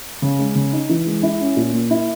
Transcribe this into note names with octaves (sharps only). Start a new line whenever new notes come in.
C#3
G#3
C#3
D#4
E3
G#3
E4
C#4
A#2
A#3
E4